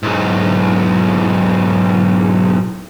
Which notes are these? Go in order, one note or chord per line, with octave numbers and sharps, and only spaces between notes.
B1 G#2